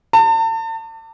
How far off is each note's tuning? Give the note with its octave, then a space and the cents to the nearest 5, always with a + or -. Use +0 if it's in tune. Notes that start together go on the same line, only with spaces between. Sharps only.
A5 +40